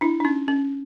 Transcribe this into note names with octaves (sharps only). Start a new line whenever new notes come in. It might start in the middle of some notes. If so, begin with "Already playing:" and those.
D4 E4
D4
C#4 D#4
C#4